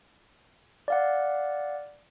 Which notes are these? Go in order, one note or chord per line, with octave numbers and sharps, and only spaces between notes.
D5 F5 F#5